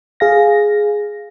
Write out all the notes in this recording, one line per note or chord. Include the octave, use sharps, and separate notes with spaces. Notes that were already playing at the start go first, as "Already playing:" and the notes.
G#4 F5 A#6